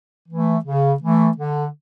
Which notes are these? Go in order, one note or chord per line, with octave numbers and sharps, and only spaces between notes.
E3 A3
C#3
E3 A3
D3